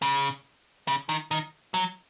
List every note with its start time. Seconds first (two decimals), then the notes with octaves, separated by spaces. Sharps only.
0.02 C#3
0.88 C#3
1.09 D#3
1.31 D#3
1.74 F#3